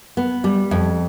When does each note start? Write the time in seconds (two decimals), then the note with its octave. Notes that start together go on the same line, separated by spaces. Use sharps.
0.17 B3
0.44 G3
0.71 F2